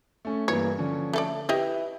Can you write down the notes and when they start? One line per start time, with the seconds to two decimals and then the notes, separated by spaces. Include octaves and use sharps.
0.25 A3 C#4
0.48 G2 E3 A#3 C#5
0.78 D3 F3 C#4
1.13 A3 A4 D5
1.49 E4 G4 B4 D#5 E5